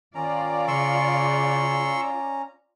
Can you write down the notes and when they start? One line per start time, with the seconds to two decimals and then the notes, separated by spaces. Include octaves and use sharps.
0.15 D#3 C#4 F4 D5 F5 A#5
0.68 C#3 C6 C#6 E6